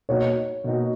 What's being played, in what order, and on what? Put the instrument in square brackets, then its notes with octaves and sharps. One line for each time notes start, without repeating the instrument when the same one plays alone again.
[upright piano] B2 A#3 D#4 F#4 [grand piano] C#5
[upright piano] B2 A#3 D#4 F#4